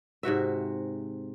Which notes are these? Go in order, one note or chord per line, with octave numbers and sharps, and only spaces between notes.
G#2 C3 F#4 E5